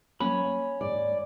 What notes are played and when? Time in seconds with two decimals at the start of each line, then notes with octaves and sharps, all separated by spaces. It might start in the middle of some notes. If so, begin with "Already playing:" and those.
0.20 F#3 A#3 C#4 B5
0.46 G#5
0.81 D#2 G#2 D5